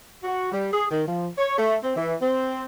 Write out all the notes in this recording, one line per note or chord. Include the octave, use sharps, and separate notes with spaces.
F#4
G3
G#4
D#3
F3
C#5
A3
C4
E3
C4